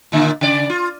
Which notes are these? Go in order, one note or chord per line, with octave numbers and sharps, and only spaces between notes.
A#2 D3 A#3
C#3 D5
F4